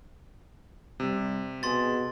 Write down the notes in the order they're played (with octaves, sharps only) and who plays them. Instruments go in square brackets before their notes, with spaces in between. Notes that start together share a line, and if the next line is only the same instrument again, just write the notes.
[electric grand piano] C3 [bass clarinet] G3
[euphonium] B2 [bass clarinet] G#4 [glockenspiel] C6 A6